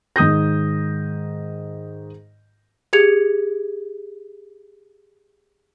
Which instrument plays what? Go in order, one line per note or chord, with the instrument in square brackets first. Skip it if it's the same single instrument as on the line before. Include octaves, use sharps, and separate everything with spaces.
[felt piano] G#2 D#3 D#6 G6 A#6
[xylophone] G4 G#4 G#6 C#7 F7